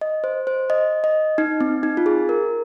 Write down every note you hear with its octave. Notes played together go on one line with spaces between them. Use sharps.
D#5
C5
C5
D#5
D#5
D#4
C4
D#4
F4
G#4
A#4